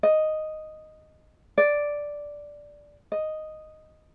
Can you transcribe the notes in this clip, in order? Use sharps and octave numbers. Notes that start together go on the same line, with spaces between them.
D#5
D5
D#5